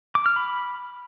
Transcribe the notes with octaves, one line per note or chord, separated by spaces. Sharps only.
D6
F6
B5